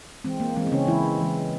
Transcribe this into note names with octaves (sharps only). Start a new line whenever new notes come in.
E3 G#3 C4
A#3
E3 G#3 C4
C4
C#3 C#4
E3 G#3 E4
E3 G#3